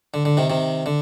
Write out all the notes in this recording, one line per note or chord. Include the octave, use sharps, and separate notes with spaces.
D3
D3
C3 D#3
C3 D#3
D3